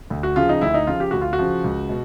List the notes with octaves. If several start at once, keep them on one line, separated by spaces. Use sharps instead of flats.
D2
F#4
C#3 F3 F4
D#4
D2 E4
D#4
C#3 F3 F4
G4
D2 F#4
F4
F#4
C#3 F3
C#2
B2